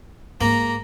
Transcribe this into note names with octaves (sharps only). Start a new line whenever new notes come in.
G#2 A#3 A#5